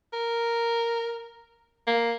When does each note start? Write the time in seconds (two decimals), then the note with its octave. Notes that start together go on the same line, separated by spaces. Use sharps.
0.13 A#4
1.87 A#3